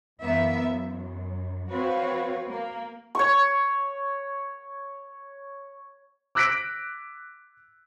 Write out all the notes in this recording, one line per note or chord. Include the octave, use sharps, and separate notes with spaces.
F#2 E3 A#3 B3 E5
F#2
F3 C4 F#4 B4 C#5 F5
A#3
C#5 C#6
D6 E6 F#6 A#6 B6 D7